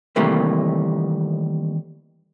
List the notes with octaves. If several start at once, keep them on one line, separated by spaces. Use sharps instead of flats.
D#2 C3 E3 G3 A3 A#3